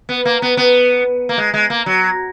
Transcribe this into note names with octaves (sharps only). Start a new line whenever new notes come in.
B3
A#3
B3
B3
A#3
G#3
G#3
A#3
F#3